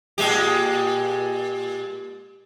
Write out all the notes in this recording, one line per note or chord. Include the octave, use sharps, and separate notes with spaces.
A#2 G#3 G4